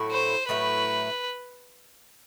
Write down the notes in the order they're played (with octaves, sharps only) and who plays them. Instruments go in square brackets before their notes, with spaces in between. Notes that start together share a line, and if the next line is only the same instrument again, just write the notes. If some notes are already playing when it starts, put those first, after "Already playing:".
Already playing: [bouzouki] A2 F#3 A3 E4
[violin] C5
[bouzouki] A2 F#3 A3 E4 [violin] B4